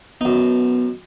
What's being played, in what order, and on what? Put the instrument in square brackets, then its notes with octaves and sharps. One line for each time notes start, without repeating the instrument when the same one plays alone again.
[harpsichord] F#2 D#4 [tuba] B3